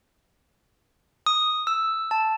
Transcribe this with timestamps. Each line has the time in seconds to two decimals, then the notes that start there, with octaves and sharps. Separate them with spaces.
1.26 D#6
1.67 E6
2.11 A5